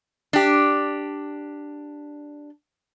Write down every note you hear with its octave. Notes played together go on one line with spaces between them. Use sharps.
D4 G4